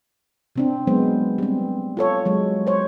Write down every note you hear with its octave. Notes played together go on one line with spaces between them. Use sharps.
C3 C4 D4
F#3 G#3 B3 C5
G3 C4
F4 A4 C#5
F#3 G#3
C5 C#5